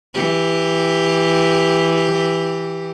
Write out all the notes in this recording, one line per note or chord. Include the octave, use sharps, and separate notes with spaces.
E3 G4